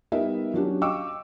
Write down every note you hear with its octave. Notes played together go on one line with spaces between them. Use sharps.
G3 B3 D#4 A#4 D#5 E5
F#3 C#4 D4 F#4 G4
D#5 F5 G5 C#6 D6 E6